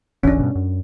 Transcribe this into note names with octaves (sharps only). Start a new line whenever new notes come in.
D#1 G#1 E3 C#4 D4
G2 B2
F#2